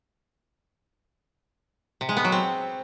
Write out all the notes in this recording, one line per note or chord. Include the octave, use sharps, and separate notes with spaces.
C3
G#3
B3
F#3
C4